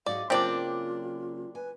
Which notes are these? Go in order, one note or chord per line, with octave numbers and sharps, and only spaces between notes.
G#2 F#4 G#4 D5 F5
C#3 F#3 A#3 C4 D4 F4 G4 D5
B4 G#5